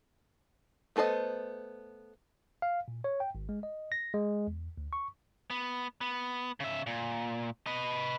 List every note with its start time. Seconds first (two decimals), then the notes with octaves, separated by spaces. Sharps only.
0.96 A3 B3 A4 C5 D#5
2.62 F5
2.88 A#2
3.04 C#5
3.20 G5
3.35 G#1
3.49 G#3
3.63 D#5
3.92 A#6
4.14 G#3
4.47 E2
4.78 D2
4.93 C#6
5.50 B3
6.01 B3
6.60 C#3 E5
6.86 A#2
7.66 B4 D#5